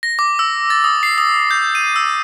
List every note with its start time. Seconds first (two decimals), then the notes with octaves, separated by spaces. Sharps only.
0.03 A#6
0.19 D6
0.39 E6
0.70 A6
0.84 D#6
1.03 C7
1.18 D#6
1.51 G6
1.75 D#7
1.96 E6